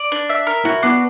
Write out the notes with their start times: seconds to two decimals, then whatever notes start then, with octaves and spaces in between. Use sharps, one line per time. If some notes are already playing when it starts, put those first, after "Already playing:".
Already playing: D5
0.12 D4
0.30 E5
0.47 A#4
0.65 E4 F#4
0.83 B3 D4